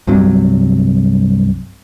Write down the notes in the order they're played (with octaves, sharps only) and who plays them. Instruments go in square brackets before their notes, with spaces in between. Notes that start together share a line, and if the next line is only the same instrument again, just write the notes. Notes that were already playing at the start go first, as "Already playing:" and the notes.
[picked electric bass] C2 G2 C3 F#3